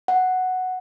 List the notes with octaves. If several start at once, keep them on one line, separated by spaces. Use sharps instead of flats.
F#5